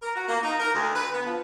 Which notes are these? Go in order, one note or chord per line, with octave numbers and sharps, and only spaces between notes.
A#4
F#4
A#3
D#4
A#4
D2
B4
B3
F3